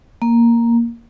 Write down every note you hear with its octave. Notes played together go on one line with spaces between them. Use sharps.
A#3